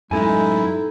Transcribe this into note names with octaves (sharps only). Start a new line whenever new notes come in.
F#2 A2 G#3 D#4 E4 A4 G#5